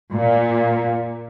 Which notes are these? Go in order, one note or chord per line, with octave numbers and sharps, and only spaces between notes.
A#2